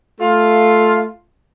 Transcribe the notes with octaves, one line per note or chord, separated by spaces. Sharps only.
A3 F4